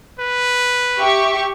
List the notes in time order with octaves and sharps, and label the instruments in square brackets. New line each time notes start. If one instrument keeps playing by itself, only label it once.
[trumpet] B4
[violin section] G4 E5 C#6